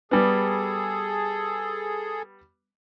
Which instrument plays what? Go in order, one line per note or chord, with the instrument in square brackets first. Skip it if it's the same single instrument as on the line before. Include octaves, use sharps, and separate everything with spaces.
[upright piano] G3 B3 [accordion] G#4 A4